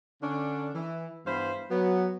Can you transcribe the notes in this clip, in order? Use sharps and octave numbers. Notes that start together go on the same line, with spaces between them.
D3 C#4 D4
E3
G2 E3 B3 C5 F5 B5
F#3 B3